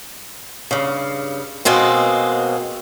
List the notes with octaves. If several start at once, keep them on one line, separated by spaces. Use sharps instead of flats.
G2 C#3
B2 G#3 A#3 C4